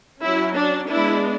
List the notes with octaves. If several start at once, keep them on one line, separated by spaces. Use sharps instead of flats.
F#3 C#4 E4
D4
G#3 B3 D4 E4